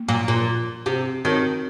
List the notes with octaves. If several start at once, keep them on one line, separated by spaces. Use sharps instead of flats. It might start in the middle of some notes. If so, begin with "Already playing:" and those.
Already playing: A#3
A#2
A#2
C3
D#3 C4 F#4 A#4 C#5